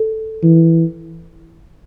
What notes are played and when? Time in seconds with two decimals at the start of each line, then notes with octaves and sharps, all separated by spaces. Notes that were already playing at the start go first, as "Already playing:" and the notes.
Already playing: A4
0.43 E3